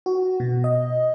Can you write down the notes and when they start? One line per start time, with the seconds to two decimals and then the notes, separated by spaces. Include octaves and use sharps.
0.06 F#4
0.40 B2
0.64 D#5